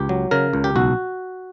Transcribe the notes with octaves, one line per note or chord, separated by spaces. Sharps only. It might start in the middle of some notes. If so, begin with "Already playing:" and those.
Already playing: C#2 G4
F#3
C#3 A#4
C#2
G4
B1 F#4